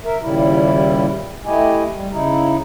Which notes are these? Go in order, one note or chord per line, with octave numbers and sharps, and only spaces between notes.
A#4 E5
D#2 A#2 C#3 G3 E4
A3 E4 G4 D#5 G#5
G3
C#3 D#4 E4